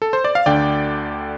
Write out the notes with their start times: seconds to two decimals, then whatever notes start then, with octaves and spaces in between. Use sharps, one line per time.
0.02 A4
0.13 C5
0.25 D5
0.35 F5
0.46 D2 D3 D5 G5